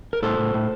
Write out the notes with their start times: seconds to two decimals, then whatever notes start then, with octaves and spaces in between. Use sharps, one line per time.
0.13 A#4
0.23 A2 A4 C5
0.38 A2
0.54 A2